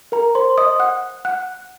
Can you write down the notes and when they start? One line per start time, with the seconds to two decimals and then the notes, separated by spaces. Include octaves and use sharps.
0.12 A#4 A#5
0.35 C5 C6
0.58 D#5 D#6
0.80 F#5 F#6
1.25 F#5 F#6